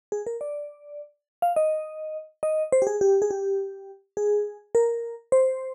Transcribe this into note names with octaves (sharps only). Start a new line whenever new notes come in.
G#4
A#4
D5
F5
D#5
D#5
C5
G4
G#4
G4
G#4
G4
G#4
A#4
C5